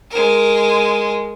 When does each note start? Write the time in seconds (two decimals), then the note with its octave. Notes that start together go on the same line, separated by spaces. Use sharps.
0.11 G#3 A#4